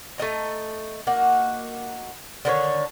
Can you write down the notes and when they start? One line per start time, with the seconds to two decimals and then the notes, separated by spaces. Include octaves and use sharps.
0.18 A3 A4 D#5 A#5
1.07 A#3 D#4 F#4 F#5
2.45 D3 D#3 C5 C#5